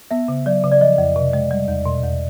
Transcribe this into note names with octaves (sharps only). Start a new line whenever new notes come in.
B3 E5
C#3
F#3 D5
C#3
D5
F3 D#5
F2
C3
G#3
G3
E2
B2
E2